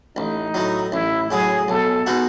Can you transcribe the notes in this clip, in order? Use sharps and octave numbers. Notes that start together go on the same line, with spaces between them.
A1 D#4
A2 F#3
A1 E4
A2 F#3 G#4
B1 A4
B2 G#3 D#4 F#4